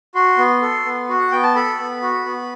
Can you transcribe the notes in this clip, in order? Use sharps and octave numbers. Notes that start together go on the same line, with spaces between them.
F#4 C6
B3
A4
B3
F#4
F#5
B3 G5
A5
A4 B5
B3
F#4
B3